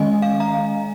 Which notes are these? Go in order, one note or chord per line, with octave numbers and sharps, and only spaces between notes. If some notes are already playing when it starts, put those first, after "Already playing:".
Already playing: D#3 G#3 C#4 D#5 G#5
F5
F5 A#5